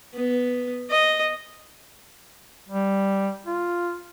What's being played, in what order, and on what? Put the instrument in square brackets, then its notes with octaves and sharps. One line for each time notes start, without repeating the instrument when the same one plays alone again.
[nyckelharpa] B3
D#5
[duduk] G3
F4